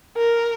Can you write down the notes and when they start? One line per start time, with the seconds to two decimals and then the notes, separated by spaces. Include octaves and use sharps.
0.18 A#4